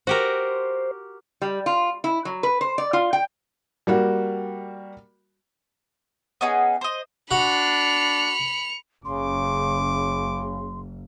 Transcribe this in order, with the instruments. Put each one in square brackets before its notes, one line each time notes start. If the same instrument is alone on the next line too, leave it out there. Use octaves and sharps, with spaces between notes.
[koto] F#4 G4 A#4 [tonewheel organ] C5
[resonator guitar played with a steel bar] G3
F4
E4
F#3
B4
C5
D5
F4
G5
[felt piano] G3 A#3 F#4
[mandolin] B3 C#4 D#4 G#4
C5 D#5
[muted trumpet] D4 [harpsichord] F#4 F#5 [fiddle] B5 [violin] C#7 F7
[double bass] F#1 [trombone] C#3 [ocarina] C6 [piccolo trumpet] D6